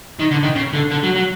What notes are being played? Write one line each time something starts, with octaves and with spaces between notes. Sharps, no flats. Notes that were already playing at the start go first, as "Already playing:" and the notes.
D#3
D3
D#3
C#3
D3
D3
F#3
F#3